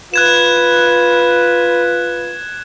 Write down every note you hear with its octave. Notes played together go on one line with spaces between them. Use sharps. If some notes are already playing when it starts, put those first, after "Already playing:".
F4 B4 F#6 G#6 E7